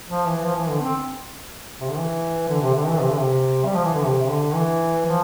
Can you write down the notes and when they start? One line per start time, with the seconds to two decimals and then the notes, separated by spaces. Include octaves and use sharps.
0.09 F3
0.26 E3
0.44 F3
0.56 E3
0.69 D3
0.82 C4
1.80 C3
1.89 D3
1.98 E3
2.48 D3
2.62 C3
2.75 D3
2.87 E3
3.00 C3
3.10 D3
3.19 C3
3.65 G3
3.74 F3
3.84 E3
3.94 D3
4.04 C3
4.21 C3
4.29 D3
4.55 E3
5.06 F3